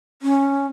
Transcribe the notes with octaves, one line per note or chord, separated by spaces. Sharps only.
C#4